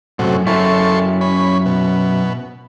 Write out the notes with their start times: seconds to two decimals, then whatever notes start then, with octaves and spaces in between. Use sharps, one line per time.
0.19 F#2 A2 C3 F#3
0.47 F#2 E4 A4 C6 C#6
1.21 C#4 B5
1.66 B2